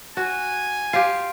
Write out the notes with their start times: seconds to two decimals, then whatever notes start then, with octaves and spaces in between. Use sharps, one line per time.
0.17 F#4 G#5
0.93 F4 G4 F5